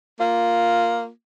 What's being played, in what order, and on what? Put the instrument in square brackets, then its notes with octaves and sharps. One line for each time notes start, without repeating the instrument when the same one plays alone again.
[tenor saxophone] A#3 [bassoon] F4